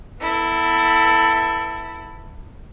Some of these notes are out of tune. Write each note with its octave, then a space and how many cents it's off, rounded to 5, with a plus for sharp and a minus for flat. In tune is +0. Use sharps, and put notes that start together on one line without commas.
B3 +0 E4 +0 A4 +20